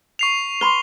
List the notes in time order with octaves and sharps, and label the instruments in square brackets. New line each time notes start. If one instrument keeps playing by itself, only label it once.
[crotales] C#6 C7 F7
[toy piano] B4 B5 C6 [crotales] G7